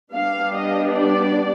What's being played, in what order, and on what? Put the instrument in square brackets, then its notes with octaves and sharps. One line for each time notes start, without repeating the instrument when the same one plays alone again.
[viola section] G3 B3 D4 F5
D#5
D5